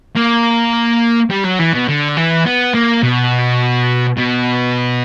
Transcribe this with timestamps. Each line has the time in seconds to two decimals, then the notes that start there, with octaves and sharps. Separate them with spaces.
0.16 A#3
1.31 G3
1.45 F#3
1.60 E3
1.74 B2
1.89 D3
2.17 E3
2.46 B3
2.74 A#3
3.03 B2
4.17 B2